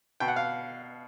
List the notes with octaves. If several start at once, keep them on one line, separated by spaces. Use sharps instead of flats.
B2 G5
F#5
F5